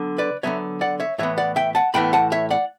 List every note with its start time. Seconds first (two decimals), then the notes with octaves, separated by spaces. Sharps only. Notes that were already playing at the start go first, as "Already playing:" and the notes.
Already playing: D3 F#3 B3
0.18 B4 D5
0.43 D3 F#3 B3 C#5 E5
0.81 D5 F#5
1.00 C#5 E5
1.18 A2 E3 B3 C#5 E5
1.38 D5 F#5
1.56 E5 G5
1.75 F#5 A5
1.94 A2 E3 B3 G5 B5
2.13 F#5 A5
2.32 C#5 E5
2.50 D5 F#5